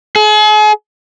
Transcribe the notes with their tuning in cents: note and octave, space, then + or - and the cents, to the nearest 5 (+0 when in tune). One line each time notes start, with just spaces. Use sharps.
G#4 +40